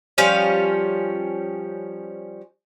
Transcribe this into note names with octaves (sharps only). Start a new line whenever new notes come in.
F3 G3 C#4 F5